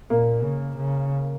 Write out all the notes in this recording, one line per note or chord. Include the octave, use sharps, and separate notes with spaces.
A#2 A#3
C#3
C#3